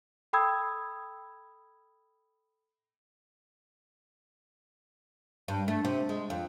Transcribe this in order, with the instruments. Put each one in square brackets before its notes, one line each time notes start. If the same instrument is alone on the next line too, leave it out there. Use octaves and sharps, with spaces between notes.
[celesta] A4 G5 B5 D#6 E6 G#6
[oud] G2
A3
C3
G#3
F2